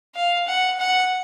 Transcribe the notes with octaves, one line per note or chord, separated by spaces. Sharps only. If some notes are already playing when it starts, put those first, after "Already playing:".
F5
F#5
F#5